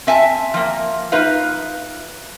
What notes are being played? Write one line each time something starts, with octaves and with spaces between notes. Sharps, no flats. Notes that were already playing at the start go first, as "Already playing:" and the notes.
C4 E5 G#5 A5
F3 A#3
D#4 F4 B4 E5 F5